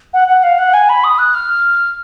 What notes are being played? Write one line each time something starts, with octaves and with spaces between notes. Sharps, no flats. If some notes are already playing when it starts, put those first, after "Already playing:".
F#5
F#5
F5
F#5
G#5
B5
D#6
F#6
F6